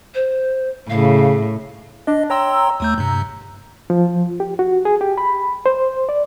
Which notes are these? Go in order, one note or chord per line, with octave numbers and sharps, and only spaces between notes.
C5
A2 C#3 F5
D4 D#5
C#5 G5 A#5 C6 E6
D#2 A3 G6
G2 C3
F3
G4
F#4
G#4
G4
B5
C5
D5